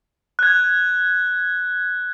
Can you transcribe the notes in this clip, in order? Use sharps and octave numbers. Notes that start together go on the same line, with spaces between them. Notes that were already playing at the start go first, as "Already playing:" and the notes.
F#6 G#6